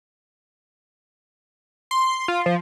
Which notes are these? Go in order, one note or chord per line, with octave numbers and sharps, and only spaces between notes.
C6
F4
F3